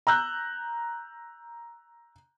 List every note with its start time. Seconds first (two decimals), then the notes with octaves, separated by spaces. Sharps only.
0.07 A#5 E6 F#6 G6